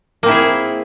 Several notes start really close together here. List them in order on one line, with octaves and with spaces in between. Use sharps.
A#3 C4 E4 G#4